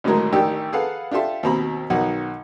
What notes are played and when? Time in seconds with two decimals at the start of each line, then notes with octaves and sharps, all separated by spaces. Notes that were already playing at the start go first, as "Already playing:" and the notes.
0.04 G#1 A2 D3 F#3 G#3 A#4
0.32 A1 D#3 D4 G4 G5 E6
0.73 G#4 A4 B4 F5 F#5
1.11 D4 F4 G4 A4 E5 C6
1.43 D#2 B2 C4 A#5 B5
1.90 B1 D#3 D#4 F#4 F#5